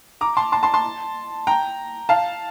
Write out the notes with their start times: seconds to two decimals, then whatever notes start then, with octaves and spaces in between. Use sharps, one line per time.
0.21 A#5 D6
0.37 A5 C6
0.52 A5 C6
0.63 A5 C6
0.74 A5 C6
1.47 G5 A#5
2.09 F5 A5